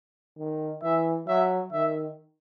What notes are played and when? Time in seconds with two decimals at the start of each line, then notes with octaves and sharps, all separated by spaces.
0.38 D#3
0.83 E3 E5
1.27 F#3 E5
1.72 D#3 E5